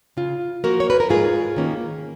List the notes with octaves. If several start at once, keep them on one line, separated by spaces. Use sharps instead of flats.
C#3 F4
F3 A#3 F#4 A#4
C#5
B4
A#4
G#2 F4 G#4
D#3 A#3 C#4